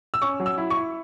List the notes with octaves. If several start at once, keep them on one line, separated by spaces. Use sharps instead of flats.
E6
C#4 C#6
F#3
E6
E4
C#6
E4